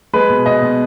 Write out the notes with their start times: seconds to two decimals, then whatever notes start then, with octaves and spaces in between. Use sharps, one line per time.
0.13 G#3 B4
0.30 B2
0.46 B2 D#5
0.62 B2